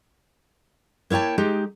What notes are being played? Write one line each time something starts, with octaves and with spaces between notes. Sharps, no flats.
A#3 E4 C#5 G5 A5
G#3 D#4 G4